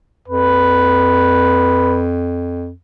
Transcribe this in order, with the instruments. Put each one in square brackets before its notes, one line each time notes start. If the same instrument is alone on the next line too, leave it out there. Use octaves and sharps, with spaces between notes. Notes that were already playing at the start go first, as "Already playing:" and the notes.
[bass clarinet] F2 [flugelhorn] B4